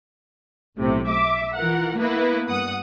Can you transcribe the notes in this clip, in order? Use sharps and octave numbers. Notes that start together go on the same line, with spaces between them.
B1 A2 C3
E5 D6
E3 F4 A#4 F#5
A#3 B3 E4 B4
G2 F#5 D#6